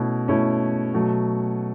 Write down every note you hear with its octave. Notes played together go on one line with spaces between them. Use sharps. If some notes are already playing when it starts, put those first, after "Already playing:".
Already playing: B2 A3 C#4 E4
B2 A3 C#4 E4
B2 F#3 A3